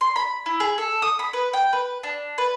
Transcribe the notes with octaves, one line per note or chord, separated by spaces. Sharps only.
C6
B5
E4
G#4
A4
D#6
B5
B4
G5
B4
D4
B4